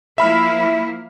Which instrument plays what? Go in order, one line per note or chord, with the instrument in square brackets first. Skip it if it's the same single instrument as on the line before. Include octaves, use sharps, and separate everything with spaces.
[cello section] F3 A#3 E4 [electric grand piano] E5 B5 F6